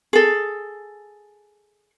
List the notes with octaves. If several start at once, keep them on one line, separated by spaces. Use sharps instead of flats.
G#4 A4